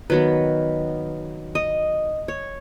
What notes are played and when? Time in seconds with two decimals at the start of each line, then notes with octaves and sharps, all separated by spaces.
0.10 D#3 F#3 B3 B4
1.55 D#5
2.28 C#5